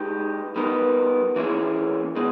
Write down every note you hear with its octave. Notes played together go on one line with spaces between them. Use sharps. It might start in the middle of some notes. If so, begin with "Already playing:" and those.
Already playing: G#3 D#4 G4
G3 B3 D#4 A#4
E3 A#3 C#4 E4 G#4
B2 G#3